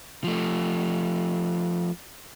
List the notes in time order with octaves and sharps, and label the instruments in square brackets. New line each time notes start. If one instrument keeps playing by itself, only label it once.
[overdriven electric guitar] F3 A3